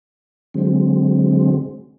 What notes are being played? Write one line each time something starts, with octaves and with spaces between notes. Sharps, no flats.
D3 F#3 G#3 C4